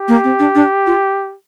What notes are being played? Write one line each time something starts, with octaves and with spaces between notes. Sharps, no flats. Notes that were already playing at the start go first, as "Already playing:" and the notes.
Already playing: G4
A#3
C4
D4
D4
F4